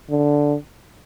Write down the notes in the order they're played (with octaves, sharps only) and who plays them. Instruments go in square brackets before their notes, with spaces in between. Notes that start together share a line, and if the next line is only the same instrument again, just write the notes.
[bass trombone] D3